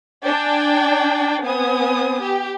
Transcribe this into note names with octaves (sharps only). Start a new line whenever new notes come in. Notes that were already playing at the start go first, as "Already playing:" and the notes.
D4 D5 G5 G#5
B3 C4 G#5 D#6
G4